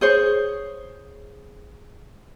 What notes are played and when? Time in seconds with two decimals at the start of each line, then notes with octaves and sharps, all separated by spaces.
0.01 G#4 C5 C#5